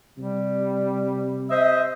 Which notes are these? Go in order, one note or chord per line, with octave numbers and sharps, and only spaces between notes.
C3 G3
C5 D#5 E5